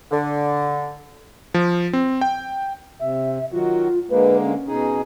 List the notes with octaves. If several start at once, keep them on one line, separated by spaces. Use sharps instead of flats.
D3
F3
C4
G5
C3 E5
D#3 F#3 F4 F#4
D3 G#3 A#3 B4
C#4
B2 D#4 G#4